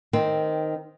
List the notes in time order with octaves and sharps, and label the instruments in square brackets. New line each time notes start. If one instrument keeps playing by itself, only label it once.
[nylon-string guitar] D#3 C4